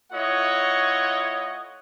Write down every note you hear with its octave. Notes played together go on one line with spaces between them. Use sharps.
A3 E4 F4 C#5 D#5 F#5